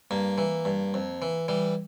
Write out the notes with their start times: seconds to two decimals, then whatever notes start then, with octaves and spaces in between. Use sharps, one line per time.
0.11 G2 A#3
0.38 E3
0.65 G2
0.94 F2
1.22 E3
1.48 E3 G3